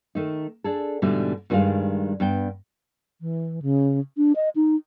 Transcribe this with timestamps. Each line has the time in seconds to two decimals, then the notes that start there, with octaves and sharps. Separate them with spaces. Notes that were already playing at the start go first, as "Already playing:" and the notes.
0.15 D#3 A3 D#4
0.64 D4 G#4 A4
1.02 G#2 B2 D3 E3 G3 A3
1.50 G2 B2 D#3 G3 G#3 F5
2.20 G2 B3 G5
3.21 E3
3.62 C#3
4.17 D4
4.36 D#5
4.56 D#4